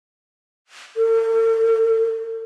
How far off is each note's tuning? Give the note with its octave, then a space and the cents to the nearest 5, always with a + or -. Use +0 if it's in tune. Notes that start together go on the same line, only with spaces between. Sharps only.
A4 +45